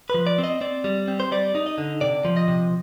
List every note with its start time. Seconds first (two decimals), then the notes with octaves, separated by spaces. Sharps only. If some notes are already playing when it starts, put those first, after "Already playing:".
0.10 F3 B4
0.27 D5
0.38 C4
0.44 D#5
0.61 C4 D5
0.84 G3
1.08 C4
1.20 C5
1.32 G3 D5
1.55 D#4
1.66 D#5
1.78 D3
2.01 C3 D5
2.25 F3
2.37 D#5
2.48 C3